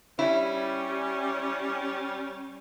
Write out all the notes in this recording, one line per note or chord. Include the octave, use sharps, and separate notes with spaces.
G3 C#4 E4